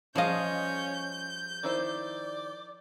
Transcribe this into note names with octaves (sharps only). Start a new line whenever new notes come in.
F3 G3 C#4 G#4 D#5 F5 G6
D#3 E4 C5 D5